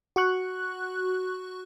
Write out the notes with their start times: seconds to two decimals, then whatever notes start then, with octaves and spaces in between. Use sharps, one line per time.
0.16 F#4 C#6 F#6